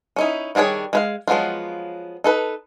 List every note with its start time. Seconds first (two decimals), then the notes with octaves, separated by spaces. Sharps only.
0.16 C#4 D#4 E4
0.55 D#3 G3 D4 G#4 C#5
0.93 G#3 B4 F5
1.28 F3 F#3 G#3 B3 F4
2.24 D#4 A4 B4